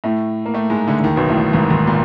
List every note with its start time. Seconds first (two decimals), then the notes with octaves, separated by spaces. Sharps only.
0.04 A2 A3
0.46 A#3
0.54 A2 A3
0.70 G#2 G#3
0.87 D2 D3
0.99 D3
1.04 D#2 D#3
1.16 B1 B2
1.28 A1 A2
1.53 G#1 G#2
1.70 G#1 G#2
1.87 A#2